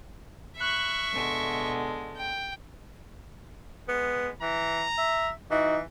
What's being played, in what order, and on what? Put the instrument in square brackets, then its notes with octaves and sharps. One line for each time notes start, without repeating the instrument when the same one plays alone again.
[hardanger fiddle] E5 C#6 [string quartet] B5 F#6
[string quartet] B2 D3 G#3
[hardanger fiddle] G5
[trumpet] G#3 [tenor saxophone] B3
[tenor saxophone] E3 [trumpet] A#5
[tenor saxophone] E5
[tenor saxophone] E3 [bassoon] D#4 [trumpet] F#4